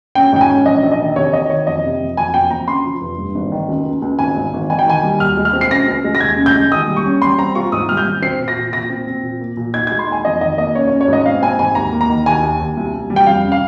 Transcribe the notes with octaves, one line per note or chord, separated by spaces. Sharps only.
C#4 G5
G#2 G5
G#5
C#4
A#1 D#5
A#1
D#5
D#3
C3 C#5
D#3 D#5
D#3 C#5
F2 D#5
C3
F2
F2 G#5
F2 G5
F2 A#5
C#3 C6
F3
F1
G2
G#1
D#3
C#2
C#2
C#2
G#1 G#5
G#2
G#1
D#3 G#5
G5
D#3 G#5
G3
D#2 F6
G#3
F6
C4
C7
C#3 A#6
C#2
G#3
A#6
D#2 G#6
C#3
G6
G#3
D#3 D#6
G3
C#6
C#4
G3 C6
C4 A#5
F4 C#6
G#2 D#6
G3 F6
G6
G#1
C4 C7
A#2
A#6
A#2
A#2 A#6
C4
C4
A#2
A#3
A#2
D#4 G#6
G#3 G#6
C6
D#4
G#5
F2 D#5
D#3 D#5
A#3 D#5
C#4 C#5
C#5
C#4
C#5
G#2 D#5
C4 F5
C4 G#5
G#2 G#5
D#2 A#5
A#3
A#5
D#3
D#2 G#5
D#2
D#2
C2
C2
G3
G5
F2 F5
C#3
F5